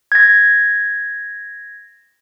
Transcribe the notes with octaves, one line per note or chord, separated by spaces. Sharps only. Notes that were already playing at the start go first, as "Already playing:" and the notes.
G#6 A#6